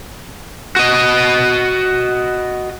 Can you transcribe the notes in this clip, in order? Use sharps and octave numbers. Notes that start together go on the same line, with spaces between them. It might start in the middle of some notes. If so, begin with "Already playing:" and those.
F#4 D#5